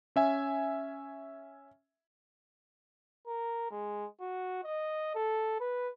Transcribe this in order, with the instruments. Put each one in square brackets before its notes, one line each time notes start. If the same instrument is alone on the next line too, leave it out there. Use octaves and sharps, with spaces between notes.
[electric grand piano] C#4 E5 G#5
[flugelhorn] A#4
G#3
F#4
D#5
A4
B4